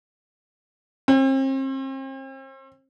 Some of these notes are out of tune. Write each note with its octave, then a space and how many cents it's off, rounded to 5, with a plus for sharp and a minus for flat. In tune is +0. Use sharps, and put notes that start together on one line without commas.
C4 +40